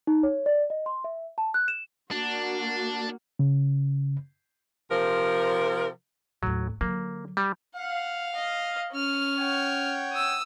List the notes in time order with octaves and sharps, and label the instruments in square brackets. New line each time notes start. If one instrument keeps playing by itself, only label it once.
[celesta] D#4
C#5
D5
D#5
C6
E5
A5
F#6
E7
[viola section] A#3 F#4 [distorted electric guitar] D4
[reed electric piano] C#3
[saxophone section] C3 F3 A#4
[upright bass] D#2 A2 [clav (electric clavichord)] F#3
[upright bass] D3 F#3 [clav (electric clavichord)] A#3
[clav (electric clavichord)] G3
[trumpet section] F5 [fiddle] F#5
[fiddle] D#5
C#4 F6
[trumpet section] C#5 F#5 G5
[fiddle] D#6 E6